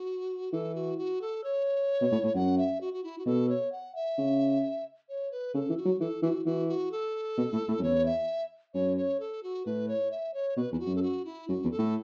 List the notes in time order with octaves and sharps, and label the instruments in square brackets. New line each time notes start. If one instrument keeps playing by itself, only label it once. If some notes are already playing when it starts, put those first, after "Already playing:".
Already playing: [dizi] F#4
[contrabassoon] E3 [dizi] A4
[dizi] F#4
F#4
A4
C#5
[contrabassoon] B2
A2
A2
[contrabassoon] F#2 [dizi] F#5
[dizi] E5
F#4
F#4
E4
F#4
[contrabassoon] B2 [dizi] A4
[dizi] C#5
F#5
E5
[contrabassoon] C#3
[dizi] C#5
B4
[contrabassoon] C#3 [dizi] A4
[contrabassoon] E3
[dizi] F#4
[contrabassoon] F#3
[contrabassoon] E3 [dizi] A4
[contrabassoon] E3 [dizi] F#4
[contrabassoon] E3 [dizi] F#4
[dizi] F#4
A4
[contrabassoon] B2
A2
A2
F#2
[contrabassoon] E2 [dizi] C#5
[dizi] E5
[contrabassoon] F#2 [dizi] C#5
[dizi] C#5
A4
F#4
[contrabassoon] A2 [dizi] B4
[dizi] C#5
E5
C#5
[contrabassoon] B2 [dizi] B4
[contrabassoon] E2 [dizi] E4
[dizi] F#4
[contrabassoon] F#2
[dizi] A4
F#4
E4
[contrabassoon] F#2 [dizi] F#4
[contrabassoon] E2
[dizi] A4
[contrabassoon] A2